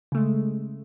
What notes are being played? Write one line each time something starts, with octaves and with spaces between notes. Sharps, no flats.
C#3 G#3 A3